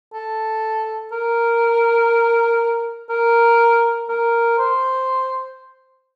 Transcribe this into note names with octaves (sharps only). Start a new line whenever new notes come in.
A4
A#4
A#4
A#4
C5